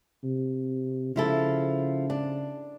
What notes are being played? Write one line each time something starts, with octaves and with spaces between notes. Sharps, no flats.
C3
C#3 F3 E4 A4
D4